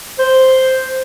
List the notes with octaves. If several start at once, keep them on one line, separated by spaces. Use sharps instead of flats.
C5